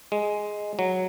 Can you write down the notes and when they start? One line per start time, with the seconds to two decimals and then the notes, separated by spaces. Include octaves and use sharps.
0.12 G#3
0.79 F#3